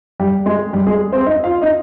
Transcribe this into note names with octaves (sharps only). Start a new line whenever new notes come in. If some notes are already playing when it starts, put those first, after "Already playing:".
G3 G4
G#3 G#4
G3 G4
G#3 G#4
C4 C5
D#4 D#5
F4 F5
D#4 D#5